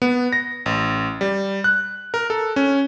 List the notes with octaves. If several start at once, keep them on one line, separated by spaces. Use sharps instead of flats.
B3
A#6
A1
G3
F#6
A#4
A4
C#4